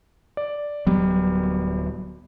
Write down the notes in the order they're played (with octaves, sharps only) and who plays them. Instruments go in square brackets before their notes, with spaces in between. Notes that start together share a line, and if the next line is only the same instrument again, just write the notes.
[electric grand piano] D5
[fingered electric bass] D1 F#3 B3 [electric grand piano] G3